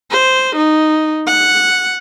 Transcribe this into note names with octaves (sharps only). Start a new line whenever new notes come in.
C5
D#4
F#5